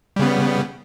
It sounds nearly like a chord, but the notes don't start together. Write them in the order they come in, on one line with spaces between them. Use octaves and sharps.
G3 C#3 B3